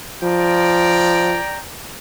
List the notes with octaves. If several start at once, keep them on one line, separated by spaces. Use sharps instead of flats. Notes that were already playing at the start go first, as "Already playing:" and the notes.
F3 D5 G5 A#5